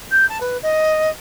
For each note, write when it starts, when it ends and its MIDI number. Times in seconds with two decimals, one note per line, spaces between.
0.11 0.28 91
0.29 0.38 81
0.40 0.57 71
0.63 1.09 75